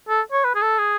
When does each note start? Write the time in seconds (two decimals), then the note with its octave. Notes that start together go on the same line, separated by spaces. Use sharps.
0.09 A4
0.32 C#5
0.44 B4
0.55 G#4
0.62 A4
0.79 G#4